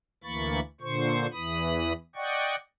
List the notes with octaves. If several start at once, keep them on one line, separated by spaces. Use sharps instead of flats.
D2 E3 A#3 B5 C#6 A6
A#2 D3 C5 C#6
E2 E3 B5 D#6
D5 D#5 F#5 G5 C#6